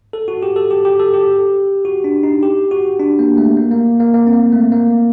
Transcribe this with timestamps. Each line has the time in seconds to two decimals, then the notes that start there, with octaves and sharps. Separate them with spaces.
0.13 A4
0.28 F#4
0.42 G4
0.56 A4
0.71 G4
0.85 G4
0.99 A4
1.14 G4
1.85 F#4
2.04 D4
2.23 D#4
2.43 G4
2.71 F#4
3.00 D4
3.19 A#3
3.38 A3
3.57 A#3
3.71 A#3
4.00 A#3
4.14 A#3
4.27 C4
4.33 A#3
4.53 A3
4.72 A#3